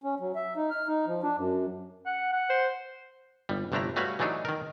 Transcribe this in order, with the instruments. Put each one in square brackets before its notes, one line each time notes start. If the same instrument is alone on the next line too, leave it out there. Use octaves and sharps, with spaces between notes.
[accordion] C#4
F#3
E5
D#4
F6
D#4
F3
D4
F#2
[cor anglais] F#5
F#5
[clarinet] C5
[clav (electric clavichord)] G1 G3
G1 C3 A3 D4 E4 A#5
G3 A3 F#4 B4 C#5 F5
E3 F#3 A3 D4 D#4
D#3 A#4